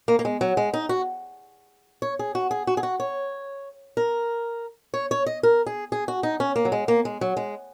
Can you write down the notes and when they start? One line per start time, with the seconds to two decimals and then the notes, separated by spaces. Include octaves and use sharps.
0.08 A#3
0.19 A#3
0.25 G#3
0.41 F#3
0.57 G#3
0.74 D#4
0.89 F#4
2.02 C#5
2.19 G#4
2.35 F#4
2.51 G#4
2.67 F#4
2.77 G#4
2.83 F#4
3.00 C#5
3.97 A#4
4.94 C#5
5.11 C#5
5.26 D#5
5.43 A#4
5.66 G#4
5.92 G#4
6.08 F#4
6.23 D#4
6.40 C#4
6.56 A#3
6.65 F#3
6.72 G#3
6.88 A#3
7.05 G#3
7.21 F#3
7.37 G#3